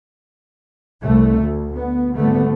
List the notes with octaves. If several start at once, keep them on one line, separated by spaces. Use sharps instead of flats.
C2 A3
D2
B3
G#1 D3 G3 A3 B3